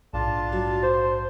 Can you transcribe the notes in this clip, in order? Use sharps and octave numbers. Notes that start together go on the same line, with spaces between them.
A#1 G#2 D4 F4 A5
F#3
C5